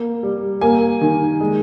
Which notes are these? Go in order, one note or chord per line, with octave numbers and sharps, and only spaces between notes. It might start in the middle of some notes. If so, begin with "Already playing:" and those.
Already playing: A#3
G3
A#3 G#5
D#3
G#3